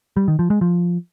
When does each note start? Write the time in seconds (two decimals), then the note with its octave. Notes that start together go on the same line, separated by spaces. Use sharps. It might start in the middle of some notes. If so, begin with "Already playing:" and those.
0.17 G3
0.28 D#3
0.39 F3
0.50 G#3
0.61 F3